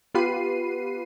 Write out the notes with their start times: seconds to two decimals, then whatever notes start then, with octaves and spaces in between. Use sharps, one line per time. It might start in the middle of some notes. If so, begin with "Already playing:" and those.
0.14 B3 F4 G4 B4 C7 D#7